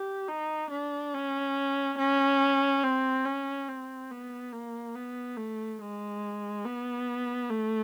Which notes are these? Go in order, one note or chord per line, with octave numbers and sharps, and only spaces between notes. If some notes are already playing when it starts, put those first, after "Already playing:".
Already playing: G4
D#4
D4
C#4
C#4
C4
C#4
C4
B3
A#3
B3
A3
G#3
B3
A3